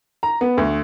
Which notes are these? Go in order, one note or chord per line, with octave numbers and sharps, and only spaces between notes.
A#5
B3
D2